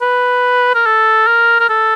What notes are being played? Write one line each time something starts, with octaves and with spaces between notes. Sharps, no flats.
B4
A#4
A4
A#4
A#4
A4